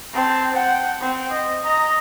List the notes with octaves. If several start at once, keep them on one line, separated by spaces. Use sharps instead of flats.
C4 A5
F#5 G5
C4
D#5
D#5 A#5